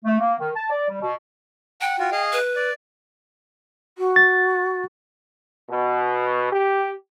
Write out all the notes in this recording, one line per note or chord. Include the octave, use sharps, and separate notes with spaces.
A3
A#3
D#3
A5
D5
G3
B2
F#5 G5
F4 F#4
G#4 D#5 F5
B4
D5
F#4
A6
B2
G4